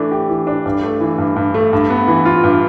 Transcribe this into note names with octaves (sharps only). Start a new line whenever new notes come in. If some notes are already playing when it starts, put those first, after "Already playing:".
Already playing: E3 A3 D4
G4
E3
D4
G2
A3
E3
G2
G2
A3
G2
B3
E3
F4
G2